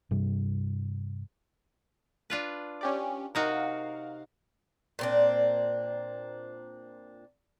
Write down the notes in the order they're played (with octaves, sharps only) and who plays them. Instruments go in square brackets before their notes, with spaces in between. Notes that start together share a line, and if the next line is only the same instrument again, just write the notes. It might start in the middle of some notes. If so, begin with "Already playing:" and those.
[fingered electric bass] G2 C3 G3
[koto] D4 F4 B4
[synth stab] C#4 G4 D5
[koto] C3 D#4 F#4 [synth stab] A#4 F5 F#5
[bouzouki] A#2 C4 D4